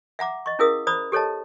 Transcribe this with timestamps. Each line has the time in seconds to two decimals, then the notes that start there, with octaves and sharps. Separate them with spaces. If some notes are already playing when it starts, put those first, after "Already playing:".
0.19 E5 F#5 A#5 D6
0.46 D#5 C#6
0.59 C#4 E4 G#4 A#4 F5 D#6
0.87 C5 D5 A#5 B5 D#6
1.12 G4 A4 C#5 D#5 A5